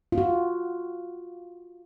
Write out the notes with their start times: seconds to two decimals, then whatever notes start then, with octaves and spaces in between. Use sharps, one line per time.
0.12 F4
0.18 F#4